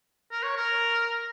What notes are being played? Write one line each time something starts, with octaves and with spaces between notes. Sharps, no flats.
A#4
C#5
A#4